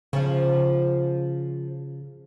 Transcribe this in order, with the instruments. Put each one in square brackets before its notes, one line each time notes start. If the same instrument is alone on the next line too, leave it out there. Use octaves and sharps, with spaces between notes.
[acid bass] C#3 [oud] F3 C#4 F4